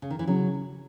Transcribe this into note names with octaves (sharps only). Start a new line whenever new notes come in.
C#3
D#3
E3
C#3 F#3